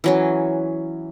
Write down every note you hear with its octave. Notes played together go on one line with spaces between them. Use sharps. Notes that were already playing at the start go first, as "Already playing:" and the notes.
E3 F#3 C#4